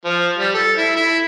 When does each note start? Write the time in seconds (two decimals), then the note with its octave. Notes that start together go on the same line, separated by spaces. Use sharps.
0.05 F3
0.38 G3
0.54 A4
0.78 E4
0.96 E4